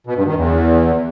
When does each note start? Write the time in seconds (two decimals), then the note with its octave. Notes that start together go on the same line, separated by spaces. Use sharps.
0.07 B2
0.17 G2
0.26 D#3
0.36 E2